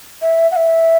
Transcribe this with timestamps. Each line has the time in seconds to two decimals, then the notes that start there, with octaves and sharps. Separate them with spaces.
0.22 E5
0.51 F#5
0.56 E5